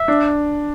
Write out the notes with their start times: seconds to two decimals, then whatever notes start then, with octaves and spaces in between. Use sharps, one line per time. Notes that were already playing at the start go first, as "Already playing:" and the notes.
Already playing: E5
0.08 D4